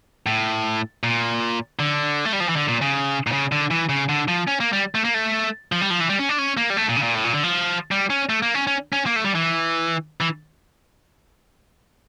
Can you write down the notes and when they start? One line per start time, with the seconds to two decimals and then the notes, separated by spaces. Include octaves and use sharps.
0.26 A2
1.03 A#2
1.79 D3
2.25 A3
2.33 G3
2.40 F3
2.49 E3
2.56 D3
2.68 A#2
2.81 C#3
3.27 A#2
3.32 C#3
3.52 D3
3.71 E3
3.89 C#3
4.09 D3
4.28 F3
4.48 C#4
4.60 A#3
4.73 G3
4.95 A3
5.05 A#3
5.14 A3
5.72 F3
5.81 G3
5.90 F3
6.00 E3
6.10 G3
6.19 C#4
6.29 D4
6.38 C#4
6.57 A#3
6.70 G3
6.77 A3
6.89 A#2
6.96 C#3
7.03 A#2
7.15 A2
7.24 A#2
7.34 D3
7.43 F3
7.91 G3
8.10 C#4
8.29 A3
8.42 A#3
8.55 C#4
8.67 C#4
8.93 C#4
9.06 A#3
9.16 A3
9.25 G3
9.35 E3
10.21 E3